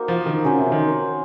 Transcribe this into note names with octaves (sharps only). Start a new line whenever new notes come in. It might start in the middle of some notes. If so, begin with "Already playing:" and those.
Already playing: A#3 D#4 F#4 C5
F3
D#3
C#3 C#4 F#4 C5
C3
D#3